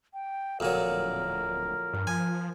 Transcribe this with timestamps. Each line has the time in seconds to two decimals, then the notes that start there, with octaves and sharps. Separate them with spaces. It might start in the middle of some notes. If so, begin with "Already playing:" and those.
0.14 G5
0.60 D1 F2 A#2 F#3 A#4
1.93 G2
2.07 F3 G#5